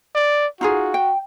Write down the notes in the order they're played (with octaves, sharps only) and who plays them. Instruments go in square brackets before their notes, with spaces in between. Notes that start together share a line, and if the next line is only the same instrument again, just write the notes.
[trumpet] D5
[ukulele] D#4 F4 G#4 [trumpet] F#4
[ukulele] G5